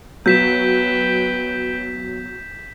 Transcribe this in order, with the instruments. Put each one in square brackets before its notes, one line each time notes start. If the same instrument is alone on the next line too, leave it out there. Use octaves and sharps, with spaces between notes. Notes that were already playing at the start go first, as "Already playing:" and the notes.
[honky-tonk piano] F#3 [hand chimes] B3 [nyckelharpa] B4 G5 [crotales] G6 B6 E7